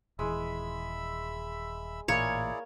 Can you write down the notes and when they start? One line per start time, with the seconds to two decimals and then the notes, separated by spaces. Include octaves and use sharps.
0.19 D#1 E3 G#3 E5 B5 E6
2.08 A1 A#2 A#3 E4 G#4 A#4 C#5 D5